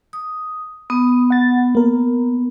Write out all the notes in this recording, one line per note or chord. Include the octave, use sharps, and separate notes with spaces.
D#6
B3 D#6
F#5 A6
A#3 A#4